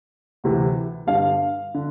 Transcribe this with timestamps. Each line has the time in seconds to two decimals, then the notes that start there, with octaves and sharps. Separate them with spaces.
0.44 D2 C3 E3
1.07 G2 D3 F5
1.74 D3